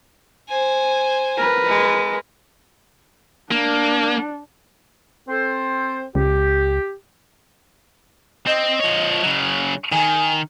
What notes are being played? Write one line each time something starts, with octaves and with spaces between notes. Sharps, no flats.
C5 G#5
A#4 B4
G#3
A#3 D4
C4 A4 C5
C#2 G4
C4 D#5
F3 C#5
C#3 F#3
D#3 G#5